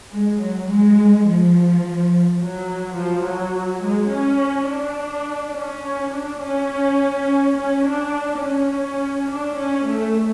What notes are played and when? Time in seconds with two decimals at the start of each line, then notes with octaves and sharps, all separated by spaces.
0.12 G#3
0.40 F#3
0.69 G#3
1.26 F3
2.41 F#3
2.98 F3
3.27 F#3
3.85 G#3
4.13 C#4
4.71 D4
5.56 C#4
6.13 D4
6.42 C#4
7.57 C#4
7.85 D4
8.43 C#4
9.30 D4
9.58 C#4
9.87 A3